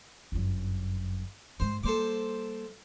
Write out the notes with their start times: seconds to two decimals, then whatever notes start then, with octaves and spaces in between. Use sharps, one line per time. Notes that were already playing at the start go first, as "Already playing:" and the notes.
0.32 G1 F#2
1.60 G#2 G#3 C5
1.83 G3 A#3 A4 C5 D6